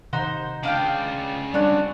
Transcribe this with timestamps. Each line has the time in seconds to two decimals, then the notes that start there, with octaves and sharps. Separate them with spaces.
0.13 C3 D#3 D#4 C5 F#5
0.63 C#3 D4 F4 F5 G5
1.54 G3 D4 C#5 F#5